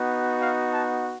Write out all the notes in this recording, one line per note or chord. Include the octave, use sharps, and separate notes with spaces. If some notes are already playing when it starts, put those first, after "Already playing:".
Already playing: B3 D#4 F#4
F5
A5